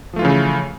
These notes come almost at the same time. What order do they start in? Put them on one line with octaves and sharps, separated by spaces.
F3 A3 F4 E3 C#3